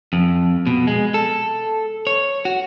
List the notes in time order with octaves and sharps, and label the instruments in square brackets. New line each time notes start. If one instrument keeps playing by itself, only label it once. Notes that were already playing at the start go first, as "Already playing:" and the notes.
[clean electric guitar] F2
B2
G#3
A4
C#5
F#4